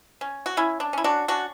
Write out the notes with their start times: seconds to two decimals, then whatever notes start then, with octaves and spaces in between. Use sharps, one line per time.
0.21 C#4
0.46 F#4
0.57 C#4 E4
0.80 D4
0.93 C#4 E4
1.04 D4 F#4
1.28 C#4 D4 F#4